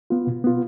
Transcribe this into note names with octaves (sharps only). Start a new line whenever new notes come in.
B3 F4
B2
B3 F4